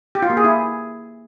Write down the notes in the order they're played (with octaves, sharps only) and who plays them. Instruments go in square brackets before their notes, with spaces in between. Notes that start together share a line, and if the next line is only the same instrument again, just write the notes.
[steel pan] G4
F4
A#3
G#4
E4